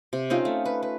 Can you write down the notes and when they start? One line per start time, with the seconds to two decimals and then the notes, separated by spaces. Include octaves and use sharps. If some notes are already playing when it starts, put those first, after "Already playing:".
0.13 C3
0.30 C4 C#4 D#4 F4
0.45 A3
0.65 B4
0.83 B4